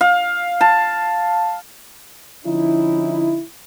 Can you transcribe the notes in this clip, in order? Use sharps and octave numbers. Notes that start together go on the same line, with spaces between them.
F5
A5
D3 F3 C#4 D#4 E4